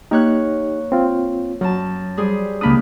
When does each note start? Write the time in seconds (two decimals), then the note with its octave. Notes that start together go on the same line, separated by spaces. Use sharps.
0.11 A#3 D#4 G4 C#5 F#6
0.92 C4 F4
1.61 F#2 F#3 A5
2.17 G3 G#4 C5
2.61 C#2 D#3 A#3 D4 B5 D#6